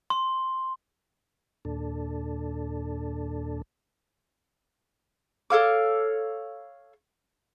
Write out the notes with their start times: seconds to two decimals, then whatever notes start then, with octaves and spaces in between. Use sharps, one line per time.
0.10 C6
1.65 D#2 A#2 D4 A4
5.50 A4 C#5 F5 D6